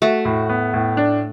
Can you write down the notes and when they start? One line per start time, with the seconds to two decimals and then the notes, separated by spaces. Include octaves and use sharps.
0.02 A3 F#4
0.25 A2
0.49 B3
0.74 A2
0.97 D4